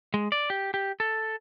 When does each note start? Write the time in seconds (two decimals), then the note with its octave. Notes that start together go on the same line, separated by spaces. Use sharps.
0.14 G#3
0.32 D5
0.50 G4
0.74 G4
1.00 A4